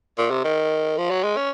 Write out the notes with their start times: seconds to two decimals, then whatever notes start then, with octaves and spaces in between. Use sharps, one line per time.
0.18 A#2
0.30 C3
0.44 D#3
0.98 F3
1.10 F#3
1.24 G#3
1.37 C#4